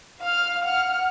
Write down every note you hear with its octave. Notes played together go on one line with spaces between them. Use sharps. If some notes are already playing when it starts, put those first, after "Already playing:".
F5 F6
F#5 F6